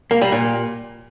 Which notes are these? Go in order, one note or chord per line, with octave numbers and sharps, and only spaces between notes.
A#3
G3
A#2